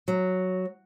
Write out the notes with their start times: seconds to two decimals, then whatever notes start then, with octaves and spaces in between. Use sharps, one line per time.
0.08 F#3